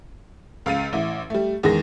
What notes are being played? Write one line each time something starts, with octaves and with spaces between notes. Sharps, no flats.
C#2 F5 A6 D#7
A1 E4
G3 A3
E2 D#3 G#3 A#6